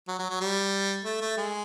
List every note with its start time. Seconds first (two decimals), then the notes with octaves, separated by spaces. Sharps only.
0.08 F#3
0.19 F#3
0.30 F#3
0.40 G3
1.05 A3
1.21 A3
1.38 G#3